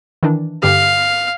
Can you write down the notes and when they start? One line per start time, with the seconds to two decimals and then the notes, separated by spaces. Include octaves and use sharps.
0.23 D#3 E3 D4
0.63 G2 D3 G4 F5